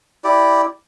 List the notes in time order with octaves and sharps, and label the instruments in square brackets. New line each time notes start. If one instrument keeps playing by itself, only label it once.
[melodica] E4 G4 D5